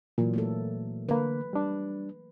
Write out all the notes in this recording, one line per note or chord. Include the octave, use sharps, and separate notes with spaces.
A#2 E3 F#3
A3 A#3 A4
D3 A#3 B4
G3 D4